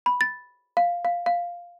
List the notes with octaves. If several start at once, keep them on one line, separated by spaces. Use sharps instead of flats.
B5
A6
F5
F5
F5